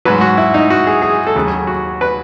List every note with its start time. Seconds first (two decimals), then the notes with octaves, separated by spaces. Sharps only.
0.05 G#2 F#3 B4
0.21 F#4
0.38 E4
0.54 D#4
0.70 F#4
0.87 G#4
1.02 G#4
1.27 A4
1.35 D#2 C#3 F#3 G#4
1.67 F#4
2.01 B4